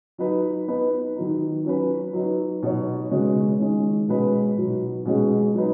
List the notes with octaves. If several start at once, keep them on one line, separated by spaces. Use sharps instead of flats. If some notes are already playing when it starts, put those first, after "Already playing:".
F#3 D#4 B4
B3 D#4 B4
D#3 F#3 D#4
F#3 C#4 B4
F#3 D#4 B4
B2 F#3 D#4 F#4 C#5
C#3 G#3 B3 F#4 C#5
D#3 G#3 C#4
B2 G#3 C#4 B4
B2 F#3 D#4
B2 G#3 C#4 G#4
F#3 D#4 B4